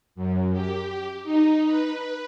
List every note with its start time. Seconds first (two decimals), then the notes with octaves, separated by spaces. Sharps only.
0.16 F#2
0.53 G4
1.24 D#4
1.65 B4